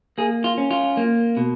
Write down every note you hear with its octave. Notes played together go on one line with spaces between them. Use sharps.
A#3 G#4
F4
C#4
F4
A#3
B2